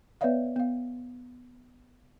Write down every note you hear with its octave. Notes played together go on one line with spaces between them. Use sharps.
B3 B4 C#5 D5 E5 F5
B3 F5